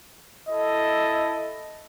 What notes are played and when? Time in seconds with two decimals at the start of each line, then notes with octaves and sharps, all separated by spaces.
0.49 E4 A4 D#5